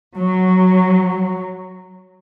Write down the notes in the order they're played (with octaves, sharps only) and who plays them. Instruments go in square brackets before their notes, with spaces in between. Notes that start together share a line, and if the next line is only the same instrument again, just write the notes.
[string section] F#3